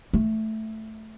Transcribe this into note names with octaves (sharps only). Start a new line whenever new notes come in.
A3